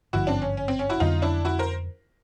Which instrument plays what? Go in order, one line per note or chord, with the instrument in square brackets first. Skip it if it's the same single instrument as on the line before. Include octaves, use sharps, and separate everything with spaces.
[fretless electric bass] G#1 G2 D3 F3 [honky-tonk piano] E4 F#4
[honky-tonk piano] C4 D4
C#4
C#4
C4
C#4
E4 F#4
[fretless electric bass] F2 D3 F#3 B3 [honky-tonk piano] D#4 F4
[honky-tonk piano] D4 E4
E4 F#4
A#4 C5